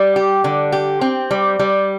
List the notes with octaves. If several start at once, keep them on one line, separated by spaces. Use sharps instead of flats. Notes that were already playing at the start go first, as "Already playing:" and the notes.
Already playing: G3
G4
D3
G4
C4
G3
G3